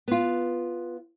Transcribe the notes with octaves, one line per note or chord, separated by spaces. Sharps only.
B3 F4